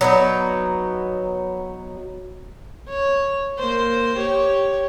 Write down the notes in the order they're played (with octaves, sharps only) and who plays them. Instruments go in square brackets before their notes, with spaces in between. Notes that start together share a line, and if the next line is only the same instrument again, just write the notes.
[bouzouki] F#3 B3 D#4
[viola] C#5
A#3 C5
G4 C#5